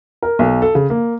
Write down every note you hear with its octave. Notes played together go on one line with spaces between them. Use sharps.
A#4
B1
A4
C#3
A#3